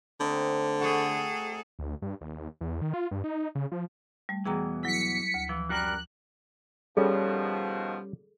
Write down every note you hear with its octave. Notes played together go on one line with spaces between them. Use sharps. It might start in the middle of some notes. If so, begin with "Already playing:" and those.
D3 A3 C4 D#4
F#4 G#4 A4
D2
G2
D#2
E2
D#3
F4
G2
D#4
C#3
F3
G3 A3
E2 B2 E3 G#4 G5 A#5
F#3 E4 B6 C#7
D2
E3 F3
F#2 G3 A#4 F#6
B2 D#3 F3 G3 C#4 G#4 A4